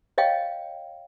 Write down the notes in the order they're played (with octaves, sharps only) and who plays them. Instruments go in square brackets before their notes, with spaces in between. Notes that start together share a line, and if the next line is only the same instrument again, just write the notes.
[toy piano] C#5 D#5 F5 G5